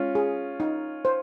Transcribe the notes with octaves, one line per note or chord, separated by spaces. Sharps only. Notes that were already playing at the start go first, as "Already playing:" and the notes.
Already playing: G#3 C#4 F4
G#4
D#4
C5